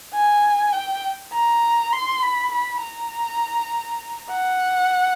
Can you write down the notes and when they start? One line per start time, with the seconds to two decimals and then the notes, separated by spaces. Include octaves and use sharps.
0.14 G#5
0.73 G5
1.33 A#5
1.92 C6
2.22 B5
2.52 B5
2.82 A#5
4.31 F#5